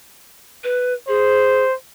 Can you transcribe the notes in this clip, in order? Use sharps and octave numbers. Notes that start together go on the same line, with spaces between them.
B4
G#4 C5